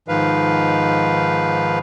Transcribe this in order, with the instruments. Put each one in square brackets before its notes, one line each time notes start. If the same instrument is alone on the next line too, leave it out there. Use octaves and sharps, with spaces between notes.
[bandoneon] G#2 D#3 F3 B4 F5